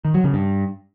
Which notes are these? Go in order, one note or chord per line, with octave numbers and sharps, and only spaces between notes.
D#3
F#3
C#3
G2